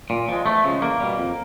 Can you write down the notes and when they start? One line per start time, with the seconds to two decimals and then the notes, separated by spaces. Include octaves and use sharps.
0.10 A#2
0.29 F3 G#3
0.46 E2 A3
0.64 C#3 F3 G#3
0.81 E2 A#3
1.00 B2 G3
1.17 F2